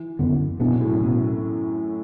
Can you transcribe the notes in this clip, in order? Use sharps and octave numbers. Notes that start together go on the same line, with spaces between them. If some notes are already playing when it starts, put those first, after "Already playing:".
Already playing: E3
F#2 D3 B3
B2 E3 B3 D4
F#3
A2
F#2
B2 B3